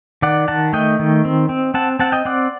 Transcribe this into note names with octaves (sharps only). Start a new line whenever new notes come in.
D#3 D5 F#5
D#3 F#5 A5
A3 D#5 G5
D#3
C4
C4
C4 F#5 A5
C4 F#5 A5
D#5 G5
C4 D5 F#5